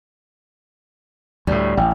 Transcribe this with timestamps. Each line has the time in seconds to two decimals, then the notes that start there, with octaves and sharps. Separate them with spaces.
1.47 D2 A2 G3
1.77 A1 G5